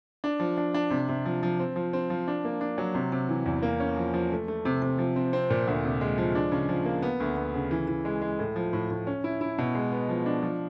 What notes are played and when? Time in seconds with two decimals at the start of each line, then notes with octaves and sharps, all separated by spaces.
0.24 D4
0.40 F3
0.57 D4
0.74 D4
0.91 C3
1.09 C3
1.25 F3
1.43 F3
1.60 C4
1.76 F3
1.93 C4
2.10 F3
2.28 D4
2.45 A#3
2.61 D4
2.78 F#3
2.95 C3
3.12 C3
3.29 E3
3.46 E2
3.62 A#3
3.80 C#4
3.97 F3
4.14 F3
4.32 A3
4.48 A3
4.65 C3
4.82 C3
4.98 F3
5.16 C4
5.33 C4
5.50 A#2
5.67 D2
5.85 C3
6.01 G#3
6.18 F3
6.35 D4
6.52 C#3
6.69 F3
6.85 A#3
7.02 B3
7.20 D2
7.37 B3
7.54 C#3
7.71 E3
7.88 E3
8.05 G#3
8.22 G#3
8.39 A2
8.56 F3
8.73 A2
8.90 A2
9.07 C#4
9.24 E4
9.41 E4
9.58 B2
9.75 G#3
9.92 B3
10.09 F3
10.26 D4
10.43 F3